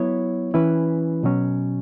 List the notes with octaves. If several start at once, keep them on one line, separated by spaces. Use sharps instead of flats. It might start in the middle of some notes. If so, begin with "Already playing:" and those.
Already playing: F#3 B3 E4 C#5
E3 C#4 E4 B4
B2 F#3 C#4